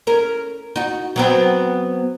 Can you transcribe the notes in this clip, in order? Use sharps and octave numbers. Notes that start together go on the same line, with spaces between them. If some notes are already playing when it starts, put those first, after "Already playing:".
C#4 A#4
D#4 F#4
F#3 B3 C4